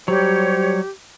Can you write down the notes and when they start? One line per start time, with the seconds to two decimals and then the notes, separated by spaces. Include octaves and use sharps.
0.08 F#3 G3 G4 C5 C#5